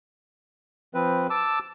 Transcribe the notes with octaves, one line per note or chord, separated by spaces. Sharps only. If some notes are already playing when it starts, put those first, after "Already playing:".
F3 C4 B4
A5 D6 E6